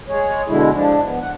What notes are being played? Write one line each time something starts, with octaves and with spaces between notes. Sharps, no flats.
G#3 G#4 C#5
B2 D3 G#3 E4
F3 D4
B3
F#5